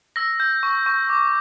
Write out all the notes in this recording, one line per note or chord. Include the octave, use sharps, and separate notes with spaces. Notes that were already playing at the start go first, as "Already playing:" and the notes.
E6 A#6
G6
C#6
C#6
D6